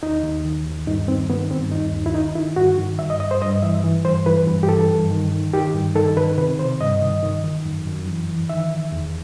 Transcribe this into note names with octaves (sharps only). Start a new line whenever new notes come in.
D#2 D#4
D#2
D#3
D#2
G2 D#4
D#3 C4
D#3 B3
G2 C4
D#2 D#4
D#2
E4
D#3 D#4
D#3 E4
G2 F#4
D#3
G2 E5
D#5
G2 D#5
C5
G2 D#5
E3 E5
E3
G2 C5
E3 B4
G2
G4
E3 A4
G2
D#3
D#3
D#3 G4
G2
D#3 A4
D#3 B4
C3 B4
C3 C5
G2 D#5
D#3
D#3
D#3
F#2
F#2
E3
E3
D#3 E5
D#3
E2